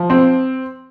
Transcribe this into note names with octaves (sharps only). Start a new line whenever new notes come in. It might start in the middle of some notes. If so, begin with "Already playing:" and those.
Already playing: F3
C4